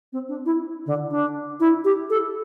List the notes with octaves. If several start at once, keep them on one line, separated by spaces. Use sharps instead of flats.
C4
D4
E4
D3
D4
E4
G4
A4